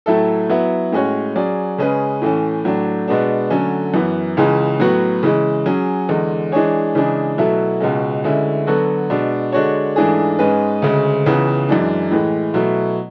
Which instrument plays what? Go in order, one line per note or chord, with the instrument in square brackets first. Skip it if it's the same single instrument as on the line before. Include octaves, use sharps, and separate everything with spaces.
[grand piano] A2 F#3 A3 E4 A4
F#3 B3 E4
A2 G#3 C#4 F#4 C#5
F#3 C#4 G#4 D5
C#3 G#3 C#4 G#4 B4
A2 E3 A3 C#4
A2 F#3 A3 D4
B2 G#3 B3 D4
D3 F#3 A3 C#4
F#2 E3 B3
C#2 C#3 E3 G#3 C#4
A2 F#3 B3 F#4
C#3 E3 G#3
F#3 C#4 G#4
E2 D3 G#3
E3 G#3 D4 G#4 C#5
C#3 E3 G#3 D4 G#4
B2 F#3 A3 E4 A4
C#2 B2 G#3 C#4
D2 D3 G#3 C#4 E4
D3 F#3 B3 F#4 A4
B2 G#3 D4
D3 G#3 D4 F#4 C#5
G#2 E3 A3 D4 G#4
G#2 G#3 C#4 G#4 B4
D2 C#3 G#3
C#2 C#3 E3 B3
F#2 E3 G#3 D4
A2 E3 G#3
B2 F#3 A3 E4